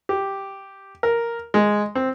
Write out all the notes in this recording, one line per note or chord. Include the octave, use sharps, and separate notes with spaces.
G4
A#4
G#3
C4